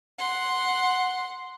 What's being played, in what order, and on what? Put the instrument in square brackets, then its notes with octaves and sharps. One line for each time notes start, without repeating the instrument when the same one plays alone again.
[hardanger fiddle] F#5 C6